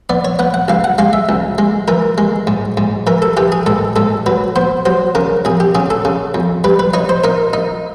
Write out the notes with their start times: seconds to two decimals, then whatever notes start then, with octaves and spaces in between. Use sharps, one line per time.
0.09 B3 D5
0.25 C#5
0.39 B3 F#5
0.54 F#5
0.68 C#2 F5
0.84 F#5
0.98 G#3 F5
1.13 E5
1.29 C#2
1.58 G#3
1.88 E3 A#4
2.18 G#3
2.47 G#2
2.77 G#2
3.07 E3 A#4
3.22 A4
3.37 E3 G4
3.52 G#4
3.66 G#2 A4
3.96 G#2 A4
4.26 F#3 B4
4.56 B3 C5
4.86 F#3 C5
5.15 C#3 A#4
5.45 F2 G#4
5.60 G4
5.75 C#3 G#4
5.90 A4
6.05 C#3
6.34 F2
6.64 G3 B4
6.79 B4
6.94 D#4 C#5
7.09 C5
7.24 D#4 A#4
7.53 D#4